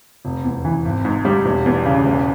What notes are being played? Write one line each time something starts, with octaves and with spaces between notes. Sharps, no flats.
F1
E2
E3
G#1
G#2
G3
E1
E2
C#3
E1